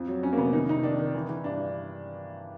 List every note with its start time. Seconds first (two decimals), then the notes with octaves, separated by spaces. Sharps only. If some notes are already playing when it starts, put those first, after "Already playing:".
Already playing: F2
0.08 F#3
0.23 F2 C#4
0.33 A#3
0.38 C3 B3
0.53 D#3 D#4
0.69 C3 D#4
0.83 D#3 D4
0.99 D#3
1.14 E3
1.29 E3
1.44 G2 D4